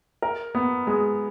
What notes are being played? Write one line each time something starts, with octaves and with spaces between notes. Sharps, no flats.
A#4
B3
G#3